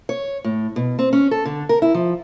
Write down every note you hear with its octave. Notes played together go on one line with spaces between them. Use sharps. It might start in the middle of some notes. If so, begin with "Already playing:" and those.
C#5
A2
B2
C4
C#4
A4
D3
A#4
E4
F3